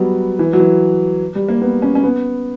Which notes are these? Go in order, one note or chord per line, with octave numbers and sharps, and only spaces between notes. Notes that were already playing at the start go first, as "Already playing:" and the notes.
Already playing: F#3 G3 B3
E3
F#3
E3
G3
A#3
B3
C#4
C#4
B3